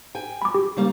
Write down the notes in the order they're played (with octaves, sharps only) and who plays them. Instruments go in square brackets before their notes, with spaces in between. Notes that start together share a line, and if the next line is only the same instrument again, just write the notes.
[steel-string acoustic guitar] G5 G#5
[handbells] B5 D6
G4
[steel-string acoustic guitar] C#3 G3 A#3